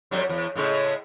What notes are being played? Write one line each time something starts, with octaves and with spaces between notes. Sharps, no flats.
F2 F#3 G3
E2
A2 C#3 G#3